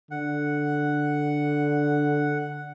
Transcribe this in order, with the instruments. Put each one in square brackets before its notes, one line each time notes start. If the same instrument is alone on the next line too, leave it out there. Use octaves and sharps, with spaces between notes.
[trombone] D3 [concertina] F#5